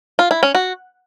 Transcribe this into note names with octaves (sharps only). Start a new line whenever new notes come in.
F4
E4
C#4
F#4